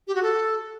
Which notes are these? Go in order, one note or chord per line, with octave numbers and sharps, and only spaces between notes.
G4
F#4
A4